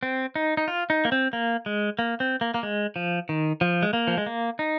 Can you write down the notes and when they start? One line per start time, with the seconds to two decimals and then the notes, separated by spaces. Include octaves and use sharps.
0.03 C4
0.36 D#4
0.57 D#4
0.68 F4
0.90 D#4
1.05 A#3
1.12 C4
1.33 A#3
1.66 G#3
1.99 A#3
2.20 C4
2.41 A#3
2.54 A#3
2.63 G#3
2.96 F3
3.29 D#3
3.61 F3
3.83 G#3
3.93 A#3
4.07 F3
4.18 G#3
4.26 A#3
4.59 D#4